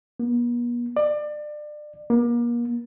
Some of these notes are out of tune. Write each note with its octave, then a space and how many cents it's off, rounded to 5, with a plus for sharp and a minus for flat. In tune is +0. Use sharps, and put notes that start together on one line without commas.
B3 -45
D5 +30
A#3 +35